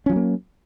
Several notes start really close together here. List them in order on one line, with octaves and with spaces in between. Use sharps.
C#4 F3 F#3 A#3